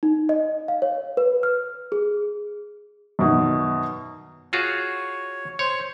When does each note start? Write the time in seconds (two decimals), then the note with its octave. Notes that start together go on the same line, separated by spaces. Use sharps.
0.03 D#4
0.29 D#5
0.68 F5
0.82 C#5
1.17 B4
1.43 F6
1.92 G#4
3.19 F#2 B2 D#3
4.53 F4 F#4 G#4 C#5
5.59 C5 C#5